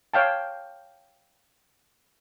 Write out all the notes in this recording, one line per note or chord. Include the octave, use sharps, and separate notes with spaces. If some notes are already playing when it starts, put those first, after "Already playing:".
C#5 F5 G5 A5